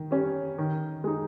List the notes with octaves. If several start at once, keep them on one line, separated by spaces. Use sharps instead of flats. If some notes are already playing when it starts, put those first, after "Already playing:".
Already playing: D#3
G3 C#4
D#3
G#3 D#4